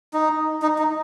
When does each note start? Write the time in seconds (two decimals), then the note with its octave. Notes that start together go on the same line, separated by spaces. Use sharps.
0.14 D#4
0.62 D#4
0.79 D#4